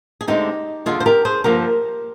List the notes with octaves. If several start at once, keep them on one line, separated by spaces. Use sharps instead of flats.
G#4
D2 D3 G#3 C4 D#4 G4
D#2 D3 G3 F4 G#4
C5
G4 A#4
G#4 C5
G2 D3 F3 A#3 G4 A#4